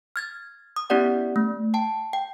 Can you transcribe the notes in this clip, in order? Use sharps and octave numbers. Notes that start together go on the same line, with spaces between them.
F6 G#6 A6
D#6
B3 C#4 E4 G4 D5 F#5
A3
G5 A5
G5